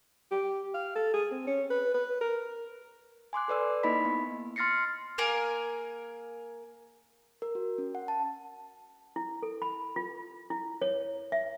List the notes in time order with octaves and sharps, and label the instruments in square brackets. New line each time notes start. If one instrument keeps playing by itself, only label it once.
[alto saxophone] G4
F5
A4
G#4
C4
C#4
B4
B4
A#4
[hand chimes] G#5 C6 D6 F#6
A4 B4 D5 E6
A#3 D#4 E4 D#5 B5 B6
B3
C6 F6 A6 A#6 C7 C#7
[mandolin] A#3 G#4 A#4 G#5
[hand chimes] A#4
F#4
C#4
F#5
A5
[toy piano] E4
A4
B5
F4
E4
C#5
E5